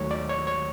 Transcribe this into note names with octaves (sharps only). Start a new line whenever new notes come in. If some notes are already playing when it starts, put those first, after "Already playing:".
Already playing: D#2 D#3 F#3 A3 C#5
D5
C#5
C#5